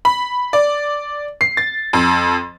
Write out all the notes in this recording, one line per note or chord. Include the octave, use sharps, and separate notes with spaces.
B5
D5
C7
A6
F2